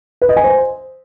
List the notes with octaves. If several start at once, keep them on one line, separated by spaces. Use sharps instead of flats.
B4
D#5
G#5
C5